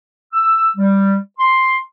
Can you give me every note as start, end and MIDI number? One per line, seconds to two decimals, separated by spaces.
0.33 0.69 88
0.76 1.15 55
1.39 1.77 84